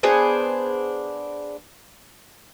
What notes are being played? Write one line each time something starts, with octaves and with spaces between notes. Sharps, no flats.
B3 D4 G#4 C5